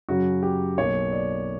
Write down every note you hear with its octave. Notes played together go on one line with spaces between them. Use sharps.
F#2 C#3 F#3 F#4
G4
B1 B2 A#3 C#5
D5